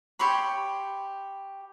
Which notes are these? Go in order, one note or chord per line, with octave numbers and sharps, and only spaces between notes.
G4 C#5 B5 C6